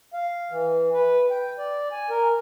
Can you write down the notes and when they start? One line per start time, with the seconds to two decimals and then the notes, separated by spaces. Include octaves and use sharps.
0.13 F5
0.51 E3
0.93 B4
1.30 G5
1.58 D5
1.92 G#5
2.10 A#4